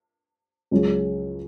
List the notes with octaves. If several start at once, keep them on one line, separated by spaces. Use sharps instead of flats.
C#2 C#3 F#3